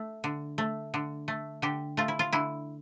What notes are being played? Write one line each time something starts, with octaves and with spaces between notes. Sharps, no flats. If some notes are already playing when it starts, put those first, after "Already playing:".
Already playing: A3
D3
A3
D3
A3
D3 G4
A3 F4
E4
F4
D3 E4